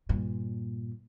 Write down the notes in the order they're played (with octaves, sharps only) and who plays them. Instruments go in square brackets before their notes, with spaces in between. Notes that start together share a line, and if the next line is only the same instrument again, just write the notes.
[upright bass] G2 A#2